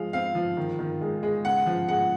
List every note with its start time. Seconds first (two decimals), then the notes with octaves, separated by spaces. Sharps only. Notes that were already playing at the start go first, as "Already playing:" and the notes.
Already playing: F3 G#3 F5
0.13 C4 F5
0.35 F3
0.57 D#3
0.79 D#3
1.01 G#3
1.23 G#3
1.45 C#3 F#5
1.66 F3
1.89 G#3 F#5